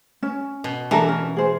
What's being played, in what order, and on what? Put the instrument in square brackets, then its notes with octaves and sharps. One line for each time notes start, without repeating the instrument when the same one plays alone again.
[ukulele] C#4
[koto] B2
[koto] E3 [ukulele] D4 A4 A#4
[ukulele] C#4
G#4 C5